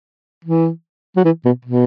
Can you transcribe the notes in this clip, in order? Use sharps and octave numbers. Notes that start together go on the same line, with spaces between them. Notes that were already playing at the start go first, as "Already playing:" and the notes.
E3
F#3
E3
B2
B2